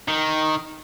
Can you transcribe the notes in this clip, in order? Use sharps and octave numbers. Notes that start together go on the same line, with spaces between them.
D#3